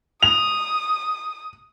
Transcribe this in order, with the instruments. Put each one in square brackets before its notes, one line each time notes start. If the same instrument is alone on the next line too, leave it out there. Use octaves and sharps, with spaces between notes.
[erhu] D#6 [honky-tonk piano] F7